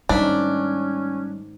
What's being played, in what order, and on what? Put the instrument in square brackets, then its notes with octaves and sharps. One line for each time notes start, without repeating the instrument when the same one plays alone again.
[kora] G#2 D#3 E5 [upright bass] G3 A3 [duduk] C#4 [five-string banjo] D4